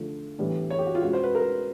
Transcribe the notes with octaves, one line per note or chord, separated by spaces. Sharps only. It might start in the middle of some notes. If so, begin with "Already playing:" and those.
Already playing: D3 F3 A3
A2 E3 G3 B3 D4
C#5
G4
F#4
F4
B2 G#3 C#4 F#4
C5
B4
A#4